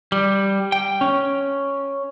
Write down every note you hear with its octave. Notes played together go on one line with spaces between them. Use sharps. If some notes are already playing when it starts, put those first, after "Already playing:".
G3
G5
C#4